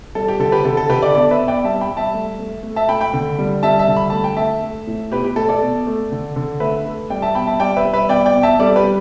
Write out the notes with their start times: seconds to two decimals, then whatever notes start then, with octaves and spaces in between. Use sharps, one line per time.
0.15 G3 A4
0.28 G4
0.40 D3 A4
0.52 G4 B4
0.65 D3 A4
0.77 A4
0.89 D3 G4 B4
1.02 A4 D5
1.14 B2 A4 D5
1.31 B4 E5
1.40 B2
1.48 D5 G5
1.64 G3 E5 A5
1.81 G5 B5
1.89 G3
1.97 E5 A5
2.14 A3
2.39 A3
2.63 A3
2.76 E5 A5
2.89 A3 G5 B5
3.01 G5 B5
3.13 D3
3.38 G3
3.63 G3 E5 A5
3.79 E5 A5
3.88 D3
3.97 B5
4.10 A3 A5
4.24 G5
4.37 A3 E5 A5
4.63 A3
4.87 A2
5.11 B2 G4 B4
5.24 G4
5.36 A3 A4
5.49 A4 D5
5.62 B2
5.87 A3
6.12 D3
6.36 D3
6.60 A3 B4 E5
6.86 A3
7.10 G3 D5 G5
7.22 E5 A5
7.35 B2 G5 B5
7.47 E5 A5
7.60 G3 D5 G5
7.77 B4 E5
7.85 G3
7.93 B4 E5
8.09 B2 D5 G5
8.26 D5 G5
8.34 B2
8.43 E5 A5
8.59 G3 A4 D5
8.76 G4 B4
8.84 G3